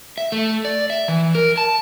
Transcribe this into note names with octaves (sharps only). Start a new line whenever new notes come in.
E5
A3
D5
E5
E3
A#4
A5